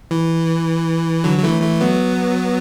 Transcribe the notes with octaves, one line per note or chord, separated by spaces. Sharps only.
E3
D3 F#3
F#3
E3 A3
E3 A3
F#3 B3